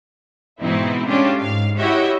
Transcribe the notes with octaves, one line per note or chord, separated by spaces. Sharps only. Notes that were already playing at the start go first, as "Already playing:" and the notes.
G#2 B2 E3 C4 D#4 E4
G#3 A3 C#4 D4 F4 G4
G#2 F5
E4 F#4 G4 C#5 D#5 E5